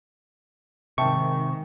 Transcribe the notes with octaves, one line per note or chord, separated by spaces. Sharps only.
G#2 C3 D#3 E5 G5 A5 C#6